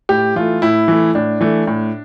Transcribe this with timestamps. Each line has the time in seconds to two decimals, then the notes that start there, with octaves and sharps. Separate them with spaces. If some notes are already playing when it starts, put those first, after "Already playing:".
0.09 A2 G4
0.36 E3 A3 F4
0.62 A2 E4
0.88 E3 A3
1.15 A2 D4
1.41 E3 A3
1.67 A2